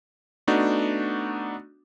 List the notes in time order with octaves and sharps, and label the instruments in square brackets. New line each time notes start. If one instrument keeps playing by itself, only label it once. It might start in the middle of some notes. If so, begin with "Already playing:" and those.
[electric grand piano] A3 B3 D4 D#4 F#4